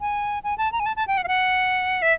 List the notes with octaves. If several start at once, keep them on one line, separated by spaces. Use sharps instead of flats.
G#5
G#5
A5
A#5
G#5
A5
A5
G5
F#5
F5
F#5
E5